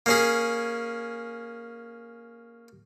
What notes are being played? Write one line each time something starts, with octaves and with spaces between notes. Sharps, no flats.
A#3 C#4 G#4